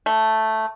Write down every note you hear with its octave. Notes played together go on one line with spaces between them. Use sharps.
A3